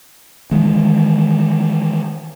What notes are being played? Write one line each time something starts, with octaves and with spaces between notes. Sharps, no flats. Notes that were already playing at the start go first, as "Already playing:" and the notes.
D#3 E3 G#3